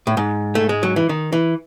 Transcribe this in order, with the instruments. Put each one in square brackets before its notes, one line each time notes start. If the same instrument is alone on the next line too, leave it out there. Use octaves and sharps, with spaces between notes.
[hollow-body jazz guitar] A2
G#2
A3
G#3
F#3
E3
D#3
E3